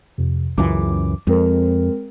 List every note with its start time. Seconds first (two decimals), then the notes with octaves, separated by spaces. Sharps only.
0.18 F2 C3
0.58 C#2 F#2 E3 D6
1.27 F2 G#3 C4 A#4